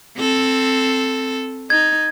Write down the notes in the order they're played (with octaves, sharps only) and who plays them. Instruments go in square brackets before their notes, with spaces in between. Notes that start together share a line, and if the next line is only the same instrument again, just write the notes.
[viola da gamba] C4 A4
[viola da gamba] D#4 [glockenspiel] G#6